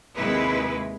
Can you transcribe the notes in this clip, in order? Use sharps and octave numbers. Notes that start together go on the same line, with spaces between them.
D#2 C3 G#3 E4 B4